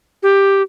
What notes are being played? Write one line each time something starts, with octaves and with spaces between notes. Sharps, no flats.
G4